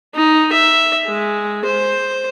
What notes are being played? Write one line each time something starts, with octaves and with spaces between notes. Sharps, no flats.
D#4
E5
G#3
C5